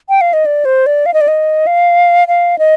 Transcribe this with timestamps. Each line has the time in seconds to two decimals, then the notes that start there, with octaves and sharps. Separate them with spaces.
0.09 G5
0.21 F5
0.33 D#5
0.46 D5
0.65 C5
0.86 D5
1.06 F5
1.14 D#5
1.21 D5
1.28 D#5
1.67 F5
2.28 F5
2.59 D#5